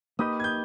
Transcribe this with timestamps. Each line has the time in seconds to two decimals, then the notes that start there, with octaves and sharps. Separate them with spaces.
0.19 A#3 D#4 G4 B4 D#5 D#6
0.40 G#6
0.44 G6